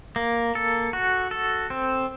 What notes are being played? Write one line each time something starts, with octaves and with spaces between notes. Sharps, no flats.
A#3
A4
F#4
A4
C4